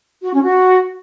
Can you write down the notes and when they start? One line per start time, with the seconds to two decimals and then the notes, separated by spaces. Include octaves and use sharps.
0.23 F#4
0.33 C#4
0.43 F#4